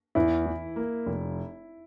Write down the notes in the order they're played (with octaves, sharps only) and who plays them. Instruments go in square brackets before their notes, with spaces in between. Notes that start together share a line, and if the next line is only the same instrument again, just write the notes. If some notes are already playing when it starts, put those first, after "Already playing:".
[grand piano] E2 [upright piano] E4
[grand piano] E3
A#3
F1